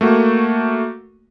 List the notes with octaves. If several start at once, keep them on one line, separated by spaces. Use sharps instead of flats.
A3 A#3 F#4